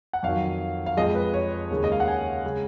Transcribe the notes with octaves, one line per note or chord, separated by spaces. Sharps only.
F#5
F2 D#3 F#3 F5
F5
F2 F3 G#3 D#5
B4
C#5
D#2 C#3 G#3
D#5
F5
F#5
G#5
C#3 G#3